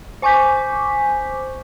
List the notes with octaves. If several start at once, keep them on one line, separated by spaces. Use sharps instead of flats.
C5 G#5 C#6 D6 G6 B6